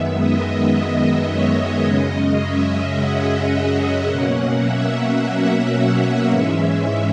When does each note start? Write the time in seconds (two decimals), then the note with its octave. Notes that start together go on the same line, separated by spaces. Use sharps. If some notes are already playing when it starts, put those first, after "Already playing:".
Already playing: F#2 D#3 G#3 B3 E5
0.18 D#5
0.73 D#5
1.29 C#5
1.84 F#2 C#3 G#3 C#4 D#5
2.40 E5
2.96 F#5
4.07 B2 F#3 A#3 C#4 F#5
4.62 E5
5.18 F#5
5.73 F#5
6.29 G#2 E3 G#3 C#4 E5